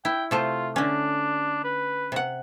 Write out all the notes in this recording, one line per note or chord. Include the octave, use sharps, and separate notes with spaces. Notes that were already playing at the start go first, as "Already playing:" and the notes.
E4 G5
C3 A3 F4 C5
D3 C#4 D4
B4
C3 F#5